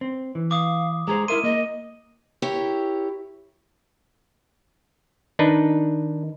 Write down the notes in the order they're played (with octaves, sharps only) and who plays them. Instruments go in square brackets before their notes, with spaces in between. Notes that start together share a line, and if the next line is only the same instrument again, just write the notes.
[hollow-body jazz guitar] C4
E3
[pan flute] F5 [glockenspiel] D6 D#6
[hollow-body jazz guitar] G#3 G#4 C5 [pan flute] A#5
[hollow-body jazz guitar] E4 E5 C6 [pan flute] A#4 [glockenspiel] D#7
[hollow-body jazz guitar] A#3 [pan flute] D#5
[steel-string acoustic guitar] E4 G4 A#4 C#5
[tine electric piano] D#3 [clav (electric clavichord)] D4 D#4 B4